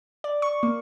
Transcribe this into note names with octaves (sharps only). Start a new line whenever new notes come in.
D5
C#6
A#3